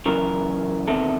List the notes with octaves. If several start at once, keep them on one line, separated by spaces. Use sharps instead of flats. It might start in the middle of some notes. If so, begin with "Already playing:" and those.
F#2 C#3 E3 A#4
E2 C3 D#3 A4